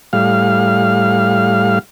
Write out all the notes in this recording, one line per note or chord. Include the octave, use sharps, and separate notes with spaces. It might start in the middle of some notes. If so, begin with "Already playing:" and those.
A2 G3 F5